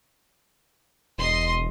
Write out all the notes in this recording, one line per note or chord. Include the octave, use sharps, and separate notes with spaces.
E1 D#5 C6